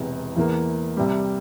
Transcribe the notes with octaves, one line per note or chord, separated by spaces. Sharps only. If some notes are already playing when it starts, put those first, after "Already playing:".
Already playing: E1 E2 C3 E3
E2 E3 A#3 E4
C2 C3 G3